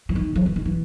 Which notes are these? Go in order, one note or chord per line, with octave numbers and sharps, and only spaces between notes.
E3
D#3
F3
E3
D#3
E3